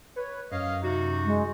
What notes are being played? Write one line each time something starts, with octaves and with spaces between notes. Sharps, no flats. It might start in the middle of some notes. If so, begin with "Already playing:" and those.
B4 C#5
F#2 C#5 D#5 F5
C3 D#4 F#4
G#3